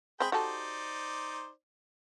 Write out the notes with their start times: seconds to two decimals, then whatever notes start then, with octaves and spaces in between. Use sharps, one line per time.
0.20 G#3 C4 G#4 G5 B5
0.32 D#4 F#4 G4 A4 C5 D5